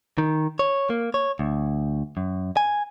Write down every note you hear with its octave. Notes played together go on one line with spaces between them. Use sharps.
D#3
C#5
A#3
C#5
D2
F#2
G#5